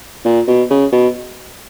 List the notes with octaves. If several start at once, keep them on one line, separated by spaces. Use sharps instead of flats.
A#2
B2
C#3
B2